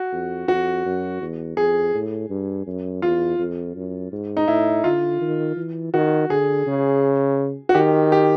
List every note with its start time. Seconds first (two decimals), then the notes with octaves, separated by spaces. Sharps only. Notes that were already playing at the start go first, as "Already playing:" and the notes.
Already playing: F#4
0.12 F2
0.48 F2 F#4
0.85 F#2
1.22 E2
1.57 F2 G#4
1.94 A2
2.30 G2
2.67 F#2
3.02 E2 F4
3.39 F2
3.76 F#2
4.12 G#2
4.37 D#4
4.48 A2 E4
4.84 D3 F4
5.21 D#3
5.57 E3
5.94 D#3 F#4
6.29 D3 G#4
6.66 C#3
7.69 F#4
7.75 D#3 G4
8.12 G4